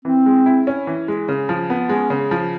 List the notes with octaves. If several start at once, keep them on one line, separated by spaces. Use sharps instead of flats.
E3 C4
G#3
E4
C#4
E3
G#3
C#3
F3
B3
G#3 C#4
C#3
F3